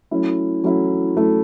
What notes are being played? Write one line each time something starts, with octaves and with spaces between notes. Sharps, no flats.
F#3 A3 C#4 E4
F#3 A3 C#4 E4
F#3 A3 C#4 E4